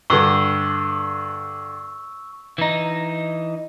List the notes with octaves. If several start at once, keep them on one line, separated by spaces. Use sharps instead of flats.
G2 D3 C#6 E6
E3 D#4